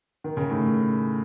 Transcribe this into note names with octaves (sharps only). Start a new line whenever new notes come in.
D#3
C#3
A2